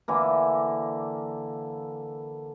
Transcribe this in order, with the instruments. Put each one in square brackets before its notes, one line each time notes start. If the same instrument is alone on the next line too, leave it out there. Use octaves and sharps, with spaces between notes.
[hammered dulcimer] D3 E3 A#3